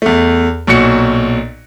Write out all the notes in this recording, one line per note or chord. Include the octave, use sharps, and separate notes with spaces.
E2 A3
B1 A#2 F#4 C#7